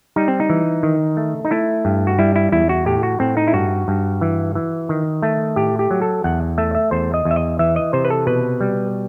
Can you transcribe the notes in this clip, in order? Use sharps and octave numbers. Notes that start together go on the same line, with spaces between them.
G3 D#4
C4
D#4
E3
D#3
A3
D#4
A3 E4
G2
F#4
G3 E4
E4
E2 E4
F#4
A2 G4
F#4
A2 C4
D#4
E4
G2 F#4
G2
E3
E3
D#3
A3
A2 G4
G4
F#3
A4
E2 F#5
A3 E5
E5
E2 C5
D#5
E2
E5
D#5
E3 E5
D#5
C3 C5
B4
A4
B2 B4
G3